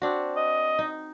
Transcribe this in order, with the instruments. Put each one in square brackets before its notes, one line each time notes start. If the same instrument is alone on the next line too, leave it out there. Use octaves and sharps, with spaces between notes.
[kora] C4 D4 F#4
[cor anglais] D#5
[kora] D#4